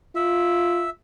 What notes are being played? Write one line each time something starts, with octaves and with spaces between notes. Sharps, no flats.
F4 E5